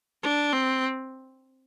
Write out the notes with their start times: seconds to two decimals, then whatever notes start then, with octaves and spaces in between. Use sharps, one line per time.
0.23 D4
0.53 C4